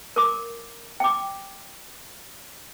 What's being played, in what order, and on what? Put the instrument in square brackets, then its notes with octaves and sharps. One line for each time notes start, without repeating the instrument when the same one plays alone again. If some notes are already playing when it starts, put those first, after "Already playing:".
[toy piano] A#4 D6
G5 D6